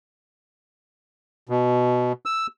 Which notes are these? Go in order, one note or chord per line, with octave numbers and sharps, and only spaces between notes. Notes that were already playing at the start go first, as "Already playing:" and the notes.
B2
E6